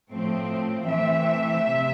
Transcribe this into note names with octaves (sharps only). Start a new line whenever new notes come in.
A2 F3 A3 C4
E3 A3 C4 E5
C3